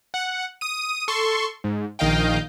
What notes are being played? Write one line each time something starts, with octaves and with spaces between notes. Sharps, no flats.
F#5
D#6 D#7
A4 C6 C#6
G#2
A#1 D#3 D#5 F5 G5